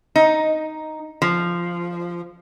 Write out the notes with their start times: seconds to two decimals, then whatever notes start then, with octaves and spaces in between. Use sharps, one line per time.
0.16 D#4
1.22 F3